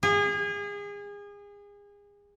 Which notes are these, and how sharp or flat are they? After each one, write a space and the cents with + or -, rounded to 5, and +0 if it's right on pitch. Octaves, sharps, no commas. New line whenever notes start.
G#4 -30